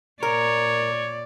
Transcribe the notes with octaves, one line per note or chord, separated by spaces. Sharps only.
A#2 A#4 C#5 D5